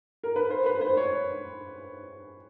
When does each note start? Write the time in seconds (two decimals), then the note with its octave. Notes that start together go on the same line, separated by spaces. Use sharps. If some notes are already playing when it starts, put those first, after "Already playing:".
0.24 A#4
0.36 B4
0.50 C5
0.66 B4
0.81 C5
0.97 C#5